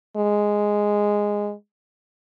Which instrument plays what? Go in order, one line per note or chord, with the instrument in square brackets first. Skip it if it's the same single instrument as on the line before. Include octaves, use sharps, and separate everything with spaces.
[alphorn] G#3